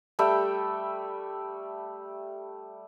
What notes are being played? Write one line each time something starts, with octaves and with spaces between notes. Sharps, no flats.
G3 A3 E5 G5